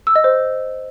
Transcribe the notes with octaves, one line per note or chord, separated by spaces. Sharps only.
E6
D#5
C5